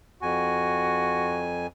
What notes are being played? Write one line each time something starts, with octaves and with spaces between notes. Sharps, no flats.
F2 F#4 G#5